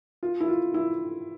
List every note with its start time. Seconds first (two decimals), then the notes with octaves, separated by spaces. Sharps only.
0.23 F4
0.40 E4
0.48 F4
0.74 E4